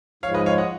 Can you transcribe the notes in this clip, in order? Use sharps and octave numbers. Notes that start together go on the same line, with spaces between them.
G#2 F3 G#3 C#5 F5
B4 D#5
C#5 F5
D#5 F#5